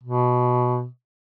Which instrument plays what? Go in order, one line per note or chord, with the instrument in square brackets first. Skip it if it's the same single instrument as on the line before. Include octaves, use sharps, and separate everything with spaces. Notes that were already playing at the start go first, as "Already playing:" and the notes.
[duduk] B2